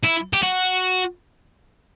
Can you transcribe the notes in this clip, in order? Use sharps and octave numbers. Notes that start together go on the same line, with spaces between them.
E4
G4
F#4